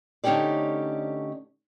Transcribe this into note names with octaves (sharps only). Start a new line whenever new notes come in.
D3 A3 C#4 D#4 G4 D5